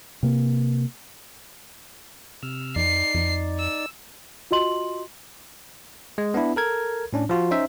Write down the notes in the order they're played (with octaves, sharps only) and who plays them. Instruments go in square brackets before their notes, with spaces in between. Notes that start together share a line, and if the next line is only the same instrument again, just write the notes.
[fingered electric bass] C3 A#3
[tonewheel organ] C3 E6 F6
[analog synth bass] F2 [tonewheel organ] D#4 D5 [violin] C7
[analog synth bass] F2
[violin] E6
[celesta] F4 F#4 D#5 C6 F#7
[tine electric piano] G#3
B3 D4 E4
A4 A#4 G#6
A2 C#4 D4
F3 F4 F#4
C#4 D#4 C5 E5